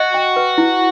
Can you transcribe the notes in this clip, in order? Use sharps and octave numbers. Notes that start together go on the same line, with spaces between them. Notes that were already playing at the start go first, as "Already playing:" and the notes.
Already playing: F#4 D#5
G5
B4
E4